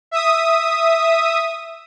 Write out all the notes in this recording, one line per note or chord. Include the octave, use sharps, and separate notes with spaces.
E5 D#6